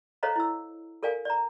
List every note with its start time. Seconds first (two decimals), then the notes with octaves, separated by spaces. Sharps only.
0.23 A4 C5 C#5 D#5 F5 A#5
0.36 E4 E6
1.03 A4 A#4 D5 F5 G#5
1.25 D5 A#5